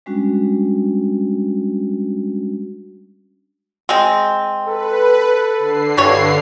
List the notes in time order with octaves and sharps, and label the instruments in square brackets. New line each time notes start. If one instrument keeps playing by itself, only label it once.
[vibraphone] G3 G#3 C#4 D4 F#4
[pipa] G#3 C4
[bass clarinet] A4 [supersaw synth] B4
[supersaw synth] D3 C7
[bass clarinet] G2 [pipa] E3 G3 C#5